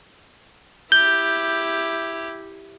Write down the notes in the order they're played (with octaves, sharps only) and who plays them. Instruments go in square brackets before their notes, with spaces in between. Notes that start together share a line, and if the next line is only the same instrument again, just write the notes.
[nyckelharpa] E4 G4 [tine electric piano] G6